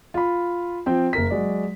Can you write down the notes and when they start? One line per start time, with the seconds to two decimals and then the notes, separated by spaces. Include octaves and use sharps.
0.14 F4 B5
0.86 F3 C4 G5
1.13 F#1 A#4 B6
1.30 F#3 G#3 D5